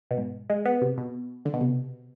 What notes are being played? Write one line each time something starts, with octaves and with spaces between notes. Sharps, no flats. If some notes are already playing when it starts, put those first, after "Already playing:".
B2
G#2
G#3
B3
C3
B2
D3
B2
C3